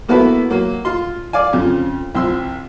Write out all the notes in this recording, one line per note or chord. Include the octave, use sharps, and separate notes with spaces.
A#3 B3 E4 F#4 A4 B4
F#3 A#3
F4 C6
D5 F5 G#5
F2 C#3 F3
C2 F3 C6 E6